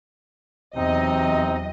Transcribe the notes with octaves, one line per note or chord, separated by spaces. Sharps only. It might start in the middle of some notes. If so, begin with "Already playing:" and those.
E2 C3 F#3 C4 D#4 D#5